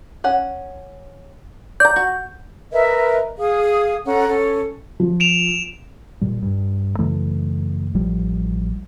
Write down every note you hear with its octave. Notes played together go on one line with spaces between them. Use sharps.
C#4 F#5
D5 A#5 G6
F#4
A#4 B4 D#5 E5
G#4 F5 D#6
C#4 A4 F#5 A#5
C#4 A4
F3
D7 E7 F7
A#2 G3
G2
F#2 C#3 E3 A3
A1 F3 G3